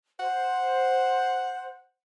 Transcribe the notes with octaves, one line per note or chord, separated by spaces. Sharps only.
C5 F#5